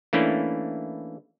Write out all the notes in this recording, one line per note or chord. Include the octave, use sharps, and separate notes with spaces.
E3 A3 A#3 C#4 D4 E4